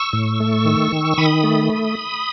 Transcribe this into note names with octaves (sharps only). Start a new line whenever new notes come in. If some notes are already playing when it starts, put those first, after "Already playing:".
Already playing: C#6 E6
A2
A3
D#3
D#3
D#3 B5 D#6
A3